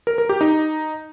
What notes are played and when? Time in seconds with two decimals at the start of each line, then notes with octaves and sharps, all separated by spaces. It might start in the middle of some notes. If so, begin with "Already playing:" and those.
0.07 A#4
0.18 A#4
0.29 G4
0.41 D#4